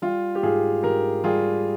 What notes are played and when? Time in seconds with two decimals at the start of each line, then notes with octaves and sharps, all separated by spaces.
0.02 G3 F4
0.35 G4
0.43 G#2 F4 G#4
0.83 G#2 G4 A#4
1.24 G3 F4 G#4